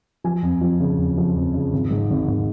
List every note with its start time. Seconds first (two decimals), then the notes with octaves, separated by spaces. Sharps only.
0.24 F3 G#5
0.43 F2
0.61 F3
0.80 C#3
0.98 F2
1.17 F3
1.36 F2
1.54 C#3
1.73 G#1
1.91 G#2
2.10 G#1
2.28 G#1